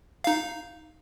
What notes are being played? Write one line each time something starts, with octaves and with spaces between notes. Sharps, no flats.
D#4 F5